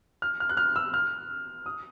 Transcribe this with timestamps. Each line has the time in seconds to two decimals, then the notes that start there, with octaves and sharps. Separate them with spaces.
0.22 F6
0.40 F6
0.49 F#6
0.57 F6
0.76 E6
0.94 F6
1.66 D#6